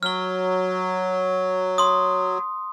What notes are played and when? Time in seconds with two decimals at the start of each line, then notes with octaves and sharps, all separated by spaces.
0.03 F#3 F6 G7
1.78 C6 D#6